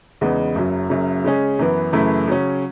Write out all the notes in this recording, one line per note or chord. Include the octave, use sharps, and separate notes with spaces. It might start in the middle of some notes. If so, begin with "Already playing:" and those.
E2 C#3 G#3 B3 D#4
F#1 F#2 C#3 F#3
F#1 F#2 C#3 F#3
C#3 G#3 C#4 G#4
F#2 E3 B3
F#2 C#3 E3 A3 E4
C#3 F#3 C#4